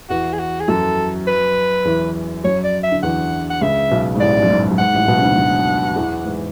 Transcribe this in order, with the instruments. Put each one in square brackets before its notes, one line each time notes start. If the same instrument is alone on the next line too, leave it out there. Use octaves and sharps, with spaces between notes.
[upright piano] E2 E3 [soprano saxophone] F#4
[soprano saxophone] G#4
F#4
G#4
[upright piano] F#2 F#3 [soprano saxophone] A4
[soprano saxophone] B4
[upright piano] E2 E3
[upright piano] F#2 F#3 [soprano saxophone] C#5
[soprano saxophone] D5
E5
[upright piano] D3
[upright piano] E2 E3 [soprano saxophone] F#5
[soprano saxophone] F#5
[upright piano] C#2 C#3 [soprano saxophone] E5
[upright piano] B1 B2
G#2
[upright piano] A1 A2 [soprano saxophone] D5
[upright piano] F#2
G#2
F#2
[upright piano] G#2 [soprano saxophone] F#5
[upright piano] A1 A2
B1 B2
C#3
D2 D3
F#2 F#3
E2 E3
G#2